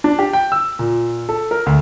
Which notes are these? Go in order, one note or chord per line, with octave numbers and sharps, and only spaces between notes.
D4
G4
G5
E6
A#2
A4
A#4
D2